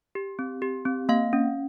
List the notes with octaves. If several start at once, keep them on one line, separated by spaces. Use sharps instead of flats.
G4
C4
G4
C4
A#3 F5
C#4